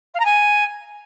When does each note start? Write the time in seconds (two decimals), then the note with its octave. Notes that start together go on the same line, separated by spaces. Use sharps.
0.14 F5
0.20 A#5
0.25 G#5